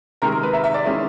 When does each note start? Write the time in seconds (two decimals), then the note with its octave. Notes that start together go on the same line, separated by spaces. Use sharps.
0.22 C3 D#3 G#3 A#4
0.32 A#4
0.43 B4
0.53 E5
0.64 E5
0.74 D5
0.84 D#3 G#3 C#4 E4